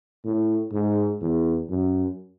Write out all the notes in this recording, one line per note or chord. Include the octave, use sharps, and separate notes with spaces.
A2
G#2
E2
F#2